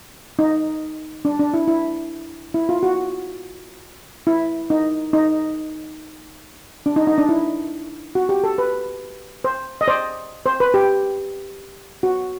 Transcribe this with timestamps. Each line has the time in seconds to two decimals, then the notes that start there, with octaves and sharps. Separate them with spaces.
0.39 D#4
1.25 D4
1.39 D4
1.54 E4
1.68 E4
2.54 E4
2.69 F4
2.83 F#4
4.27 E4
4.70 D#4
5.13 D#4
6.86 D4
6.96 D#4
7.07 D#4
7.18 D4
7.29 E4
8.15 F#4
8.29 G4
8.44 A4
8.58 B4
9.44 C5
9.81 D#5
9.88 C5 D5
10.46 C5
10.60 B4
10.74 G4
12.03 F#4